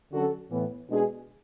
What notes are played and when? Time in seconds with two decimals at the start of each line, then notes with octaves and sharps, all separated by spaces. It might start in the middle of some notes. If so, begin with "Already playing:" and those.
0.12 D3 F#3 C#4 F#4 A4
0.51 A2 E3 B3
0.90 B2 G#3 D4 G#4